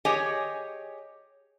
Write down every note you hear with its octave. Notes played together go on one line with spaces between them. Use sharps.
G4 G#4 C#5 D#5 G#5